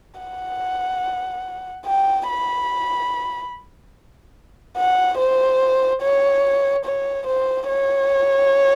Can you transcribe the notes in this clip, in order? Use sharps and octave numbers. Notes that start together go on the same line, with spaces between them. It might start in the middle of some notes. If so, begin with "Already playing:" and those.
F#5
G5
B5
F#5
C5
C#5
C#5
C5
C#5